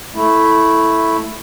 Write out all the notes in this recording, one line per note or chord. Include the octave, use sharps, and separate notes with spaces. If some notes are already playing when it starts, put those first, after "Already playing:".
A3 E4